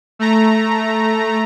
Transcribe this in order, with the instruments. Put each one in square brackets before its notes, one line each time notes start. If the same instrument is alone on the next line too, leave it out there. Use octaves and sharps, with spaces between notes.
[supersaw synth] A3 A#5